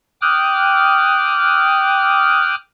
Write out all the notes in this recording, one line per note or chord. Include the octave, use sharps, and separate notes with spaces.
G5 D6 D#6 F6 F#6